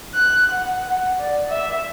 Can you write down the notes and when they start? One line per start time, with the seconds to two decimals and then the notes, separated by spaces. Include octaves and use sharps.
0.14 F#6
0.51 F#5
1.20 D5
1.49 E5